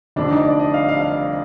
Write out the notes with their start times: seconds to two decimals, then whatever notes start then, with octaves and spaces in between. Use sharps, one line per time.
0.16 F1 F2 D3 D4
0.31 D#4
0.45 D5
0.59 D#5
0.74 F5
0.88 F5
1.02 F5